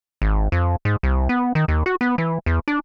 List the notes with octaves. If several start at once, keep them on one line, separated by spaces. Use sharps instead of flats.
G#1
F2
G#2
C2
B3
D#3
D#2
F#4
B3
E3
E2
D4